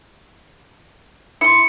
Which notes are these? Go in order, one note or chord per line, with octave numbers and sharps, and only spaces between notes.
E4 C6 C#7